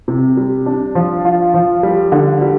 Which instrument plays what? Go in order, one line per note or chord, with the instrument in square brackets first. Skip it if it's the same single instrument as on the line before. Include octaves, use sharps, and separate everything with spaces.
[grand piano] C3
G3
D4
F3
F4
F3
G3
D3
G3